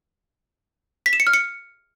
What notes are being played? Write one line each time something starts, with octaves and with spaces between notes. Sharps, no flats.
B6
E7
C#7
F6
C#7